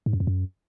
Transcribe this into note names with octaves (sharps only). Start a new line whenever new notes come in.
G#2
F#2
F2
F#2